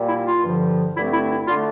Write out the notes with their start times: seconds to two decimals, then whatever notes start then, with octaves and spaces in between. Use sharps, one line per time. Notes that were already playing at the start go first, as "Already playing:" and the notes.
Already playing: A#2 G3 A#3
0.09 E4
0.27 F4
0.43 G2 D3 F3
0.96 G2 D3 A3 C4 E4
1.13 E4
1.30 E4
1.47 D3 A3 D4 F4